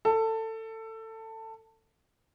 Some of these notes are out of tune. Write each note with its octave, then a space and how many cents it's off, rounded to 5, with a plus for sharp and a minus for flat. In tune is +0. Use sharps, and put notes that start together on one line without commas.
A4 +20